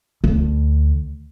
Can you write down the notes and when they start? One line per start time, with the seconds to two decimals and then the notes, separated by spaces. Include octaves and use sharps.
0.24 D2